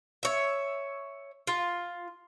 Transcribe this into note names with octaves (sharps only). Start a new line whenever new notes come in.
C#5 E5
F4